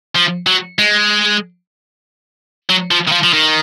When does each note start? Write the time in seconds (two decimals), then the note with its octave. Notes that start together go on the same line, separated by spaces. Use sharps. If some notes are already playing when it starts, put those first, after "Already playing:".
0.15 F3
0.46 F#3
0.78 G#3
2.69 F#3
2.91 F3
3.08 D#3
3.12 F3
3.24 F3
3.33 D#3